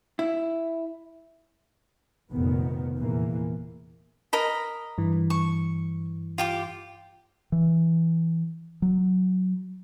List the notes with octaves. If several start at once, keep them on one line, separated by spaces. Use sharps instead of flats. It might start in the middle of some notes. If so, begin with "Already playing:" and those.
E4
F1 F2 A#2 D#3 B3
F1 E2 A#2 E3 A#3
A#4 D#5 B5
G2 E3
C#6
F4 G4 D6
E3
F#3